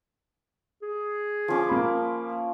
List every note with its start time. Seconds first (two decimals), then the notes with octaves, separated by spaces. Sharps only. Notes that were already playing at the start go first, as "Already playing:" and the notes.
0.82 G#4
1.48 F3 C#4 D6
1.69 A#3 B5